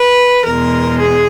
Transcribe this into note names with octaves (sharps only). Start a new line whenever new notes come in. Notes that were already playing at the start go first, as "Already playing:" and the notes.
Already playing: B4
E2 B2 G#3 A#4
G#4